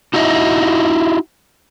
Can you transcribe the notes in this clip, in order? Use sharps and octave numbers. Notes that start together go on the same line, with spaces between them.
D#4 E4 F#4 D#5 E5